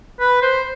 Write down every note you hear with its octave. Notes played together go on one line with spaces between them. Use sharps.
B4
C5